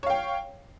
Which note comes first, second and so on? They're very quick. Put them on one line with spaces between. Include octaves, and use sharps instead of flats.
C#5 F5 G5